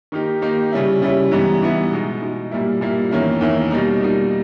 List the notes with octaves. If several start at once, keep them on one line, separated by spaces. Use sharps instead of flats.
D#3 A#3 D#4 G4
D#3 A#3 D#4 G4
C#3 G3 C#4 E4
C#3 G3 C#4 E4
G#2 E3 G3 B3 E4
G#2 E3 G3 B3 E4
B2 G#3 D#4
B2 G#3 D#4
A#2 G3 A#3 E4
A#2 G3 A#3 E4
E2 D#3 A#3 C#4 E4
E2 D#3 A#3 C#4 E4
B2 G3 A#3 D#4
B2 G3 A#3 D#4